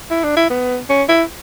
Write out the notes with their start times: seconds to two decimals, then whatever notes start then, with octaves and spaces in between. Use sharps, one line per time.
0.11 E4
0.24 D4
0.37 E4
0.50 B3
0.89 C#4
1.09 E4